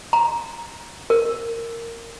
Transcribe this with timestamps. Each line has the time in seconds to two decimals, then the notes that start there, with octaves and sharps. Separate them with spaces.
0.13 A#5
1.10 A#4